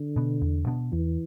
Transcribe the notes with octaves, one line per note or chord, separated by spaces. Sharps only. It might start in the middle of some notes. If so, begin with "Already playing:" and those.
Already playing: D3
B2 B3
E2
B2 B3 D4
E2 E3